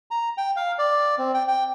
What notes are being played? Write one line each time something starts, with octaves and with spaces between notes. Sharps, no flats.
A#5
G5
F5
D5
C4
G5
G5